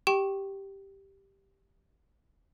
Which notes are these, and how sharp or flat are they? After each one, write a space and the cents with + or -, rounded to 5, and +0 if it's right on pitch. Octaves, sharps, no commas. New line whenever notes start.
G4 +0 G5 -15 C#6 -25